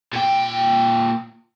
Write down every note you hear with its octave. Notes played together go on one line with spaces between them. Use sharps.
A#2 G5